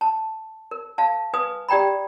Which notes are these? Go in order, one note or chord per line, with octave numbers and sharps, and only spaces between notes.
A5
A#4
F5 A5
B4 G#5 D#6
G4 D5 G5 A#5 B5